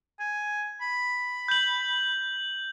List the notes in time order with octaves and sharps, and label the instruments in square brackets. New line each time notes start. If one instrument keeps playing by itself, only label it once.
[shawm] G#5
B5
[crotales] G6 F#7